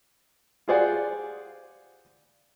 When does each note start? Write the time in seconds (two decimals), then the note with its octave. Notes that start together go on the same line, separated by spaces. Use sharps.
0.68 F4 G4 G#4 C5 D5 F#5